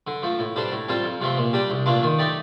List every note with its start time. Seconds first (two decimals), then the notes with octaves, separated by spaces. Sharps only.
0.07 D3
0.23 F3 A3
0.39 A2
0.56 G3 D4 A4 C5
0.72 A2
0.88 G3 C4 F4 A4
1.04 F2
1.21 C3 F3 A3 C4
1.37 A#2
1.53 G3 D4 G4
1.70 C2
1.86 A#2 A3 D4 F4
2.03 D#3
2.18 A3 D#4 G4 D5